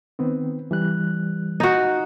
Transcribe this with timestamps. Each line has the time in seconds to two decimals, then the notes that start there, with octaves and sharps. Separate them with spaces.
0.19 D#3 B3 C4
0.71 E3 G3 F#6
1.60 D#4 F#4